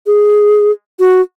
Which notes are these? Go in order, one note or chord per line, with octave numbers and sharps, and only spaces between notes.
G#4
F#4